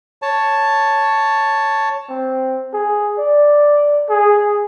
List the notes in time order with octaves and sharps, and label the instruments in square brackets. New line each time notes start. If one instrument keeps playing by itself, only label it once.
[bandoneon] C#5 A5
[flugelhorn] C4
G#4
D5
G#4